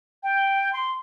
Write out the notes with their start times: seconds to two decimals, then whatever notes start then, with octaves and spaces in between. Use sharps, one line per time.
0.23 G5
0.73 C6